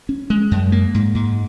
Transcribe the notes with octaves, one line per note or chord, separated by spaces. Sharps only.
C#4
G#3
F#2
A#3
G#2
G#2